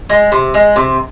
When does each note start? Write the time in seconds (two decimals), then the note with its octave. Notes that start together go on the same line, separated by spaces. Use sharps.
0.09 G#3
0.32 C3
0.54 G#3
0.76 C3